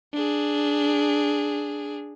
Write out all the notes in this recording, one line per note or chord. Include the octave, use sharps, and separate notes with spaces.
D4 G#4